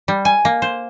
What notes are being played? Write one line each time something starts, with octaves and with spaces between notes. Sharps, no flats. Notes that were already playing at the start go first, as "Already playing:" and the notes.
G3
G#5
A#3
C5